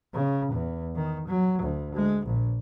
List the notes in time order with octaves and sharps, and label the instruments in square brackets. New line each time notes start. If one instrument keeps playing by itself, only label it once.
[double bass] C#3
E2
D#3
F#3
D2
G#3
A#1